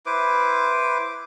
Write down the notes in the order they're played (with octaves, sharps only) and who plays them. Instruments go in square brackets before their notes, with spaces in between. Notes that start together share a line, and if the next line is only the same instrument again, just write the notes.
[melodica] E4 B4 C5 D6